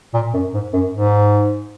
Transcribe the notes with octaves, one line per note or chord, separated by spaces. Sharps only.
A#2
F#2
G#2
F#2
G#2